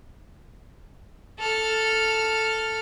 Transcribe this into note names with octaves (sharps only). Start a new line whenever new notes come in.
A4 F6